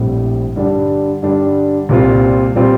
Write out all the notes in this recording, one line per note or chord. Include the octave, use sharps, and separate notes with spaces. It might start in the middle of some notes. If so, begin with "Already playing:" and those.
Already playing: A#1 A2 G3 C4
G2 D3 G3 D4
G2 D3 G3 D4
C2 A#2 G3 C4 F4
A#2 G3 C4 F4